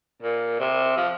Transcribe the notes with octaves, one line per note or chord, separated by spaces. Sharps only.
A#2
C3
F3